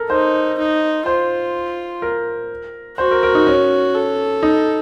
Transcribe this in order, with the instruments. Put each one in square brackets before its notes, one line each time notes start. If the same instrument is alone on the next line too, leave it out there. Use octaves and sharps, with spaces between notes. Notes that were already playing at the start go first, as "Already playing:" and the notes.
Already playing: [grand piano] A4 A#4
[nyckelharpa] D#4 [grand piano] C5
[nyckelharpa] D#4
[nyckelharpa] F4 [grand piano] C5
[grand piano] A#4
[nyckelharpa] F#4 [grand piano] C5
[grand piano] A#4
A#4
D#4
C#4
[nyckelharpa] A4
[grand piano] D#4